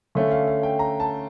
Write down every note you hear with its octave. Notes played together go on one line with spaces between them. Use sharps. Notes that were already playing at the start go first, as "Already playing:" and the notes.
D3 A3 C#4 F5
F5
F5
G5
A#5
A5